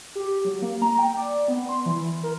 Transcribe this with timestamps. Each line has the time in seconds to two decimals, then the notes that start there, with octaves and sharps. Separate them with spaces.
0.15 G4
0.45 F#3
0.62 A#3
0.82 A#5
0.99 G5
1.17 D5
1.48 B3
1.69 C6
1.86 E3
2.23 A#4